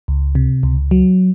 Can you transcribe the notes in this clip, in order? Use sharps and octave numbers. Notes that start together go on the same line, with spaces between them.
C#2
C3
C#2
F#3